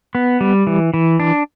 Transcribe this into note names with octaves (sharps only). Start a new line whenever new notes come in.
B3
G3
E3
E3
D4